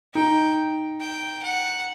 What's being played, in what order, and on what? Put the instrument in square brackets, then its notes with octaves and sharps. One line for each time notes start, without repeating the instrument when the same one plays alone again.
[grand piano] D#4 [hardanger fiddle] G5
[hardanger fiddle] G5
F#5